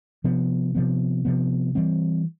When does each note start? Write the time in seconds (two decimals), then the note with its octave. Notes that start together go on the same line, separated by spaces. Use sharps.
0.24 C3 F3 B3
0.75 C3 F3 B3
1.25 C3 F3 B3
1.75 E3 G3 C4